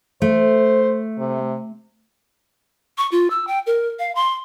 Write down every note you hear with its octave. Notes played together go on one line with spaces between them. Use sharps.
A3 C5
C3
C#6
F4
E6
G5
A#4
F5
C6